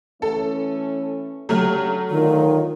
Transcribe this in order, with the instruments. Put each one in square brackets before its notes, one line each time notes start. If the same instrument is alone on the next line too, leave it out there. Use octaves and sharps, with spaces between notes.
[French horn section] E3 A3 C#4 [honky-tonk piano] A4
[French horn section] C#3 D4 G4 [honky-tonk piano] F#3 A3 F6
[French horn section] D3 F4 C#5 [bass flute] D#3